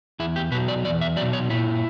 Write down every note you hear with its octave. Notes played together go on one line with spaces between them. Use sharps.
E2 E4
G4
B2 F#3 B4
D5
E2 D5
E5
B2 F#3 D5
C#5
A#2 E4